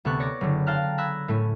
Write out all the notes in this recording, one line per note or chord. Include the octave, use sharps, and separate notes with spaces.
D2 C3 B3 A4 C#6 F#6
C#5 D5 A#6 C#7 D7
F#1 D3
F5 G5 A5 A#5 F6 F#6
B5 E6 F#6 G#6 A#6
A2 A3 C#4